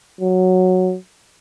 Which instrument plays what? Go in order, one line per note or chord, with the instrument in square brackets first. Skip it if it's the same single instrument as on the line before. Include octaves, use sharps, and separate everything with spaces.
[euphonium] F#3